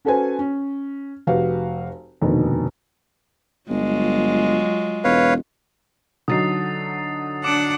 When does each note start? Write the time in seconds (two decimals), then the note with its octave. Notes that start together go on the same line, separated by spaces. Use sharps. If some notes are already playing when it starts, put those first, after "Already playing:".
0.05 C#4 F#4 A4 B4 C5 G#5
0.39 C#4
1.27 F1 F#4 G4 B4 F5
2.21 F1 D#2 B2 D3 D#3
3.70 G1 F#3 G#3 F4
5.04 E1 B4 C#5 F5
6.28 D3 F#3 D#4 D#6 A6 C7
7.44 D4 F#5 D6 D7